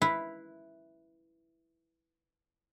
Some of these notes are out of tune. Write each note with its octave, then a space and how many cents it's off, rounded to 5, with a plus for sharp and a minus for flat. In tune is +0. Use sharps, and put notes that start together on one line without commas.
E4 +0 B4 +0 F5 +0